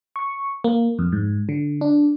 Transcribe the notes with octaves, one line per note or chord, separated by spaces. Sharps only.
C#6
A#3
F2
G#2
D3
D4